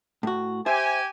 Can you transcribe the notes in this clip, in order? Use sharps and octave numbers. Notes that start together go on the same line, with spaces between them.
A2 F#4
G4 C5 E5 G#5